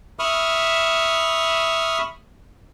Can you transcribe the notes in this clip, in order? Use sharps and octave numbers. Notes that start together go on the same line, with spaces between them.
E5 B5 C#6 D#6 F6